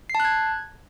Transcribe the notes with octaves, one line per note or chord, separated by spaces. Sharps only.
C7
A5
F#6
G#6